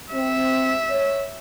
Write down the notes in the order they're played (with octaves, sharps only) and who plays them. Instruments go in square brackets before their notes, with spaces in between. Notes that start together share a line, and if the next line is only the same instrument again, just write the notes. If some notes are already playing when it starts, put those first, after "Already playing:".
[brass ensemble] C4 [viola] E5
[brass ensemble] C#5